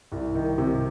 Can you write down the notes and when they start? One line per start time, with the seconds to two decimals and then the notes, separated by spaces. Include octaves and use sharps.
0.12 C2
0.35 D#3
0.58 C3